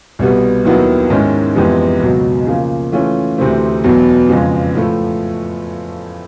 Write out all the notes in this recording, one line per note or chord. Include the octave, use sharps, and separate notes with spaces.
C2 B2 G3 B3
D#2 D#3 F#3 B3 E4
G#2 D#3 G#3 C#4 E4
F2 C3 E3 G#3 B3
C#2 B2 F#3
C#3 F3 A#3
E3 A3 C#4 F4
D2 C3 E3 A3 C4
E2 B2 F#3
F2 C#3 F3 G#3
A2 F3 A3